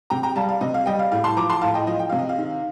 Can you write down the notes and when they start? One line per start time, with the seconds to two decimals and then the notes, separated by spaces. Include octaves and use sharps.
0.10 C3 G5 A#5
0.23 G5 A#5
0.36 G3 F5 A5
0.49 F5
0.61 C3 D#5
0.74 F5
0.86 G3 D#5 G5
0.99 F5
1.11 A2 F5
1.24 A5 C6
1.37 F3 A#5 D6
1.49 A5 C6
1.61 A2 F5 A5
1.74 D#5 G5
1.87 F3 D#5
1.99 G5
2.09 C3 F5
2.19 D#5
2.29 F5
2.38 D#3